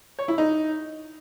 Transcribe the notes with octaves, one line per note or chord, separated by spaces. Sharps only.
C#5
E4
D#4